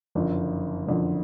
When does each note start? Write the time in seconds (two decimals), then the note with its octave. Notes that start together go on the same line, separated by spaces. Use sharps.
0.15 F#1 F2 D3
0.87 F#1 F2 D3